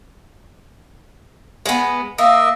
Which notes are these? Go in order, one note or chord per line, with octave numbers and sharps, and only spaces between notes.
G#3 B3
A#3 D#5 E5